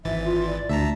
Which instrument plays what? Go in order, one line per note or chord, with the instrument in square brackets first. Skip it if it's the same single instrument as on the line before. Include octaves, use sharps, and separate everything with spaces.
[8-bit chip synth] G#1 E3 A6 [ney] E5
[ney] F4
D5
[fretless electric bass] D2 [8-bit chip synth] E5 A5 A#5